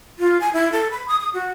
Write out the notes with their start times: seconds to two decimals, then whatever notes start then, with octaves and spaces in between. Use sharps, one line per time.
0.19 F4
0.41 G#5
0.54 E4
0.72 A4
0.91 B5
1.08 D#6
1.20 D#6
1.34 F#4